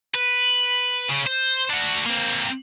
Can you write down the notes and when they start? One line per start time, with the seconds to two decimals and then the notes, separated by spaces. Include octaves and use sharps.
0.15 B4
1.09 C#3
1.27 C5
1.70 D4 F#4
2.06 A#3 C4